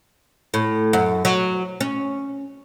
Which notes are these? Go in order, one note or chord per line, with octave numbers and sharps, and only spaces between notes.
A2
F#2
F#3
C#4